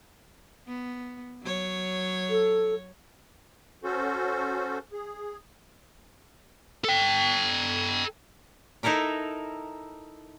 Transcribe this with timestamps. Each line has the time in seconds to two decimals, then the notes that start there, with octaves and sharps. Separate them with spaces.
0.67 B3
1.42 F#3 C#5
2.30 A4
3.84 C#4 F#4 A4 C5
4.92 G#4
6.84 A4 G5
8.83 D#4 E4 A4 A#4 E5